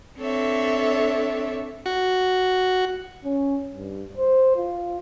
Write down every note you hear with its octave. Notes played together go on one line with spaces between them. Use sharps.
C4 D4 A4 C#5 E5
F#4
C#4
G2
C5
F4